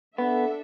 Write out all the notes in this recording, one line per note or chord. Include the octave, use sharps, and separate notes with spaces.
B3 D4 A4 E5